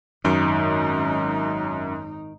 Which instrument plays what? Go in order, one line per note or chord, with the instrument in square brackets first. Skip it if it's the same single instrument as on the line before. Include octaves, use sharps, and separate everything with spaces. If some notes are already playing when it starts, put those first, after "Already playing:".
[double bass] G#1 D#4 [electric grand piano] F#2 [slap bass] D#3